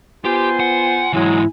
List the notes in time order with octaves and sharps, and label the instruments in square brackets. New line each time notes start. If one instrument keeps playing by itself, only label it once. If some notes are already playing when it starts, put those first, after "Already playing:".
[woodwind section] B3 F4 C5 [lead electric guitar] G4 [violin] G#5
[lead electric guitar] F#5
[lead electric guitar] G#2 E3 [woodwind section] F#3 G#3 [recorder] E4